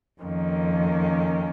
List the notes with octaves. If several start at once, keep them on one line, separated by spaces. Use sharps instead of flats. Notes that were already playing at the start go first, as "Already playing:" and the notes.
F2 D#3 A#3 C#4